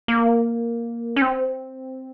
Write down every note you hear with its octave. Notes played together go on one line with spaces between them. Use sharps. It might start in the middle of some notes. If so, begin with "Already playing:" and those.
A#3
C#4
C4